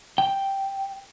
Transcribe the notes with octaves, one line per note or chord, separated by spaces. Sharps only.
G5